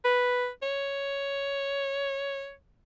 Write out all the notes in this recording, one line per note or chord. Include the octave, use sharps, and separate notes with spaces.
B4
C#5